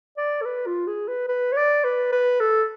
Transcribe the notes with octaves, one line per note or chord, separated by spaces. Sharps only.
D5
A4
B4
F4
G#4
B4
B4
C#5
D5
B4
B4
A4